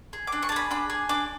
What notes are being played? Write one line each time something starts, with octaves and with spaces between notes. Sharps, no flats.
G#4
D6
D4
C#6
A5
G#4 B5
D4 B5
G#4
D4 D6